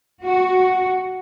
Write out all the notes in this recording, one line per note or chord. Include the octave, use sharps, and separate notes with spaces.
F#4